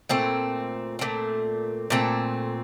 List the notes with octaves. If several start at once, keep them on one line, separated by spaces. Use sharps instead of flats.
A#2 A3 C4
A#2 A3 C4
A#2 A3 C4